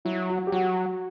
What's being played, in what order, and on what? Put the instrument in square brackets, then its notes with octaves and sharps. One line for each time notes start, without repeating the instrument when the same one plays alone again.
[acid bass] F#3 [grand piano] E4
[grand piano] F#4
G4
[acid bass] F#3 [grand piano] F#4